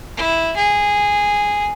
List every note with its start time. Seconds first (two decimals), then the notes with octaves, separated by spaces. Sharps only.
0.17 E4
0.56 G#4